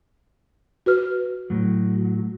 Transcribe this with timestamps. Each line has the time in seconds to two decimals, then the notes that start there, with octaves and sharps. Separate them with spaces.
0.86 F#4 B4 F6
1.50 A2 F#3